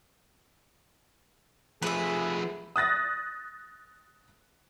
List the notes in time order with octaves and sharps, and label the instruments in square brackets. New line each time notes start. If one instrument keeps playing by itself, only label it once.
[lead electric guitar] F3 A3 [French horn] G#4 [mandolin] B4 E5
[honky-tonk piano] D#6 F#6 A6 A#6